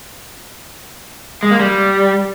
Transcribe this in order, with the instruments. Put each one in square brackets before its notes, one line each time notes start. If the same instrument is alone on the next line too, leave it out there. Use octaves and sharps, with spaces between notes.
[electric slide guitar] G#3
A#3
G3